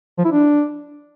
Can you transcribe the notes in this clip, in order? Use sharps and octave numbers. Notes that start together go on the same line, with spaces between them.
F3
E4
D4